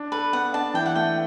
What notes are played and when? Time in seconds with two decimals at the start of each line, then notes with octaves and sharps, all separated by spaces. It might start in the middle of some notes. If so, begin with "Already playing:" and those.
Already playing: D4
0.12 A4 B4
0.33 B3 F#5
0.54 D4 A5
0.74 E3 G5
0.86 F#5
0.95 A3 G5